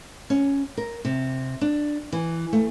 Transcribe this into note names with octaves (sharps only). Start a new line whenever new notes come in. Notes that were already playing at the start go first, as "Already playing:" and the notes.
C#4
A#4
C3
D4
E3
A3